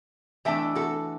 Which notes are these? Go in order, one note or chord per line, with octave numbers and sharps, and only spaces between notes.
E3 A3 D4 E5 G5
F#4 A4